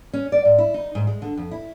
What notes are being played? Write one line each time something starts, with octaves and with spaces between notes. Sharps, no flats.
C#4
D5
G#2
E4
D#4
G#2
G#3
D3
F2
E4